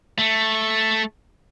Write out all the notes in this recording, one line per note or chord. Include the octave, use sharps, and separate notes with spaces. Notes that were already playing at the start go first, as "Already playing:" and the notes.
A3